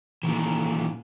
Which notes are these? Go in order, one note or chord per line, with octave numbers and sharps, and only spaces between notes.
A#2 D#3 E3